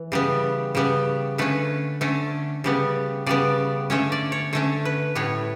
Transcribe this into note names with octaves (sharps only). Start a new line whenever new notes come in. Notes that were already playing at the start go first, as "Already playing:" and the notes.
Already playing: E3
C#3 G3 B3
C#3 G3 B3
D3 A3 C#4 B4
D3 A3 C#4
C#3 G3 B3
C#3 G3 B3 D5
D3 A3 C#4 C#5
D5
C#5
D3 A3 C#4 C#5
B4
A2 G3 B3 C#5